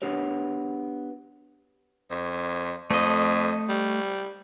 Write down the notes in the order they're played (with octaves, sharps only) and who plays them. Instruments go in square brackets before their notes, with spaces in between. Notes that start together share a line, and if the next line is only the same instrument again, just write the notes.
[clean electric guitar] B3 D4 F#4 G4 C#5
[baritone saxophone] F2
[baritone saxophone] F2 [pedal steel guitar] A3 D#5
[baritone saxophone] G3